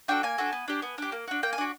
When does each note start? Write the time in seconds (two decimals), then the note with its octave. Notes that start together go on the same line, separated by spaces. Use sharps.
0.08 D4 F#4 A4 G5
0.23 A#3 G#5
0.38 D4 F#4 A4
0.52 B3
0.68 D4 G4
0.82 B3
0.98 D4 G4
1.12 A#3
1.28 D4 F#4
1.43 A#3 G5
1.53 G#5
1.58 D4 F#4